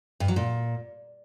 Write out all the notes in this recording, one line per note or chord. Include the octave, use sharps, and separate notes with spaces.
G2
F#3
A#2